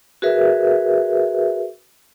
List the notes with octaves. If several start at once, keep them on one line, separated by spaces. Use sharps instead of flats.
F#4 G#4 A#4 B4 E5